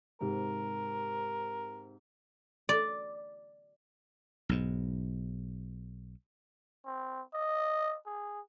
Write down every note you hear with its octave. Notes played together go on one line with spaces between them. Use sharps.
G#2 C3 A#4
D5
B1 G#2
C4
D#5
G#4